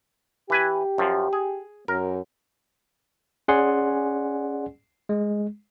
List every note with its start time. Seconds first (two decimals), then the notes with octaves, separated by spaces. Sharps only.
0.50 E3 G4 B4 G#5
0.98 F#2 F3
1.33 G#4
1.88 F#2 A#4
3.48 C#4 G#4 D5 F#5 G#5 C6
5.09 G#3